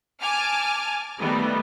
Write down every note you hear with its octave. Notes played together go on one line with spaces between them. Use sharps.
G#5 A5 D6 F6
D#3 G3 A3 B3